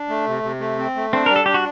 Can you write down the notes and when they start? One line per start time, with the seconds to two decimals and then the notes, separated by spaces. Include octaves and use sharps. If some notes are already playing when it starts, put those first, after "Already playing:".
Already playing: D4
0.09 A3
0.26 C3
0.43 C3
0.60 A3
0.78 C4
0.95 A3
1.13 C4 D4
1.26 G3 A#4
1.36 A4
1.46 D4 G4
1.54 F#4